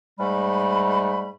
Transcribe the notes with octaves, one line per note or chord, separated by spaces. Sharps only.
G#2 G3 A3 B5